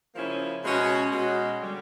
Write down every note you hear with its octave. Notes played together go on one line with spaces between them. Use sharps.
C#3 F3 A#3 C#4 E4
B2 G#3 C#4 F#4
B2 G#3 C#4 F#4
D3 G3